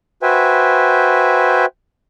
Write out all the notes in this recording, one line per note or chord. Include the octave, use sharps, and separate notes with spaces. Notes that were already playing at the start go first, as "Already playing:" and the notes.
F#4 B4 C5 E5 G5 G#5